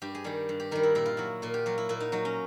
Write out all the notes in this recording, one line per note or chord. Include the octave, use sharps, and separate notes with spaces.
G2 G4
G#4
D#3 G3 G4
G2
G4
D#3 G3 A#4
E4
A#2 E4
F4
F#3 E4
A#2 F4
G4
F#3 F4
E4
A#2 E4
D#4
F#3 D#4
C#4